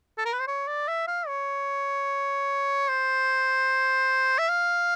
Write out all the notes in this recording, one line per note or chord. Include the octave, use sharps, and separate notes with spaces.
A4
A#4
B4
C5
C#5
D5
E5
F5
C#5
C5
E5
F5